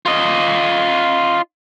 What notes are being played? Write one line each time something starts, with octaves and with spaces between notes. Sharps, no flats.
F4 D#5